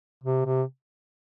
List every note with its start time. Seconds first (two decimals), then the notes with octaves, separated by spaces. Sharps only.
0.23 C3
0.46 C3